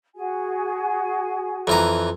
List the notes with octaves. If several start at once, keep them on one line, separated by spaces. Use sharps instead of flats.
F#4 G#4 G#5
F2 E3 A#5